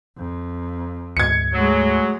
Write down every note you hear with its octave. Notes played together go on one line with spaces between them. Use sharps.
F2
D2 G#2 G#6 C#7
F#3 G#3 A3